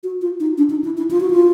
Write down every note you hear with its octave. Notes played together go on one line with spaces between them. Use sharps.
F#4
F4
D#4
D4
D#4
E4
E4
F4
F#4
F4